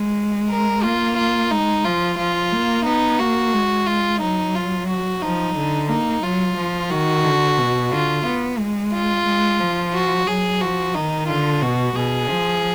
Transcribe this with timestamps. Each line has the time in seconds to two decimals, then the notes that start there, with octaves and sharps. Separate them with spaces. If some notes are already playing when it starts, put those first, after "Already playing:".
Already playing: G#3
0.50 A#4
0.83 A#3 F4
1.17 F4
1.51 G#3 D#4
1.85 F3 F4
2.18 F3 F4
2.52 A#3
2.85 B3 D#4
3.19 A#3 F#4
3.53 G#3
3.87 F4
4.21 F#3 D#4
4.55 F4
4.89 F#4
5.22 F3 D#4
5.56 D3
5.89 A#3 D#4
6.23 F#3 F4
6.57 F3
6.90 D#3 F#4
7.24 D3
7.58 B2
7.91 D3 F4
8.26 B3
8.59 G#3
8.93 F4
9.26 G#3
9.60 F3
9.94 F#4
10.27 F#3 G#4
10.61 F3 F#4
10.95 D#3 D#4
11.28 D3 F4
11.62 B2 F#4
11.96 B2 G#4
12.30 F3